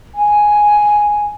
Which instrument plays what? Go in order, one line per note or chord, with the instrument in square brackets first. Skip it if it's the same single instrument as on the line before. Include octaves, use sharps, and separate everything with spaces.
[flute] G#5